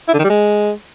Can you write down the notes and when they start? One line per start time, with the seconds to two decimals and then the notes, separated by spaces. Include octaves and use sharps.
0.08 E4
0.14 D3
0.19 D#3
0.24 G3
0.30 G#3